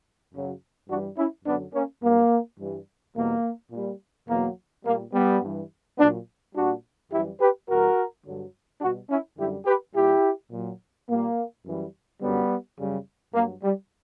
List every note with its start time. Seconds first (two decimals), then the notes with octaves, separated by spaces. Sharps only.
0.33 F#2 C#3 F#3
0.88 G2 E3 G3 D4 F#4
1.17 C#4 E4
1.45 F#2 D3 F#3 B3 D4
1.73 A#3 C#4
2.02 G2 F#3 A#3
2.59 G2 E3 G3
3.15 E2 B2 G3 A#3
3.71 A#2 G3
4.28 E2 B2 F#3 A#3
4.85 A#2 G3 A#3
5.13 G3 B3
5.41 G2 E3 G3
5.98 A#2 F#3 B3 D4
6.54 A#2 G3 D4 F#4
7.11 F#2 E3 G3 E4 G4
7.40 G4 B4
7.67 E2 B2 G3 F#4 A#4
8.25 G2 D3 F#3
8.81 B2 G3 D4 F#4
9.09 C#4 E4
9.37 F#2 D3 G3 E4 G4
9.66 G4 B4
9.94 A#2 G3 E4 G4
10.51 A#2 F#3
11.08 A#2 G3 A#3
11.64 F#2 E3 G3
12.21 F#2 D3 F#3 G3 B3
12.78 F#2 C#3 G3
13.33 G2 F#3 A#3
13.63 G3